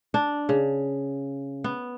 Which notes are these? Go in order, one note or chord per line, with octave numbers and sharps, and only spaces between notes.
D4
C#3
B3